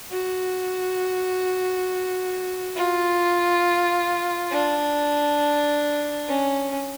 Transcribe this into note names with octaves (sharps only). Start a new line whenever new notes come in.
F#4
F4
D4
C#4